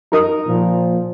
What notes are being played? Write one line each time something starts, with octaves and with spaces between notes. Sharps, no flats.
D#4 A#4 D#6
A#2 F3